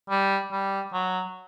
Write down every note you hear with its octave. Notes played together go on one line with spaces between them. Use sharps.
G3
G3
F#3